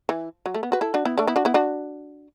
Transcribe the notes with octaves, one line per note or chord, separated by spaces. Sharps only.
E3
F#3
A3
B3
F#4 B4
E4 A4
D4 F#4
B3 E4
A3 D4
B3 E4
D4 F#4
B3 E4
D4 F#4